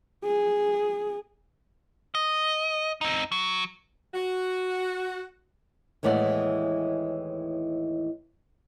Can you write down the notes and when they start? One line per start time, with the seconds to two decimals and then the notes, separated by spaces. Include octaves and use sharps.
0.24 G#4
2.15 D#5
3.01 C4 D#4
3.32 F#3
4.14 F#4
6.03 D#2 A2 E3 G#3 D5 F#5